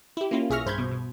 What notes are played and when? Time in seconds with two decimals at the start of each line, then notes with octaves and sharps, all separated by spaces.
0.17 E4 G4
0.31 A#3 C#4 E4 F4
0.50 B1 G#4 E5 C#6 F6 A#6
0.66 G2 C5 B5 G6 G#6
0.78 B2
0.92 B2